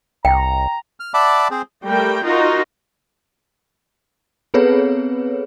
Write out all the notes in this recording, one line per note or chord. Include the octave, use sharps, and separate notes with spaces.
C2 G5 A#5
F6
D5 E5 F#5 A5 B5 D6
C4 G#4 C5
G3 A3 A#4 G5
D#4 F4 F#4 A#4
B3 C4 G#4 A4 B4 C#5